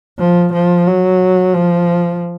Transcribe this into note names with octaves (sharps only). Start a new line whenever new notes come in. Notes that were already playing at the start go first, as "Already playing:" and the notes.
F3
F3
F#3
F3